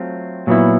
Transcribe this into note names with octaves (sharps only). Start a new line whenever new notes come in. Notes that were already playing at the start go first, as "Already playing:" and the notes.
Already playing: F#3 A3 C4 F4
A#2 F#3 B3 E4